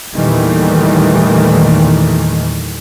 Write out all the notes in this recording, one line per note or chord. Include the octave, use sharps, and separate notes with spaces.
E2 A#2 D#3 E3 G3 A3